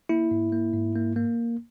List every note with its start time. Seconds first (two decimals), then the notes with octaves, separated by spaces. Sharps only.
0.09 A#3 E4
0.31 G#2
0.52 A#3
0.74 G#2
0.96 A#3
1.16 A#3